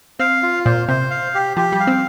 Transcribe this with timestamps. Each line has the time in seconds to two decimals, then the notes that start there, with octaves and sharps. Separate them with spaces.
0.20 C4 F5
0.43 F4
0.65 A#2 C5
0.88 C3 C5
1.11 F5
1.35 G4
1.56 F3 G4
1.72 G3
1.80 F5
1.87 C4